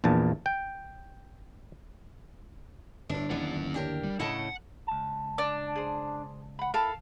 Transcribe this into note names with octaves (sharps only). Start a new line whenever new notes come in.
A#1 E2 A#2 A5
G5
G1 A2 D4
G1 D#2 E3 C#4 F#5
D4 G4 A#4
G3
A2 C#3 E4 D#5 F#5 A5
C#2 A5
D4
G#4 C5
F#5 B5
E4 A4 A#4 F5 A5